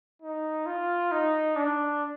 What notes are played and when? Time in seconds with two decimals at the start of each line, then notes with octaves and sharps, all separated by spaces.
0.22 D#4
0.66 F4
1.12 D#4
1.56 D4